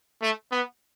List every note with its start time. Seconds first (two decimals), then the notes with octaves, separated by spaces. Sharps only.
0.22 A3
0.52 B3